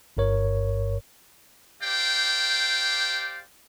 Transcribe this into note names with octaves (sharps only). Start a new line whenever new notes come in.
G1 G2 A#4 C#5
G4 C5 D5 F5 G5